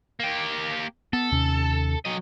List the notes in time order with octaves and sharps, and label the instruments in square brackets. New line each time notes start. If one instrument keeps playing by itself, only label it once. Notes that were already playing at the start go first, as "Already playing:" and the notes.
[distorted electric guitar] A#3 G4
[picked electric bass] B3 [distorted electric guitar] A4
[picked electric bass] D#2 C3 C#4
[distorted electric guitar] F#3 D#5